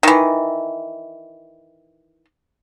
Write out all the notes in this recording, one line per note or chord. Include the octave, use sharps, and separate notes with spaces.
D#3 E3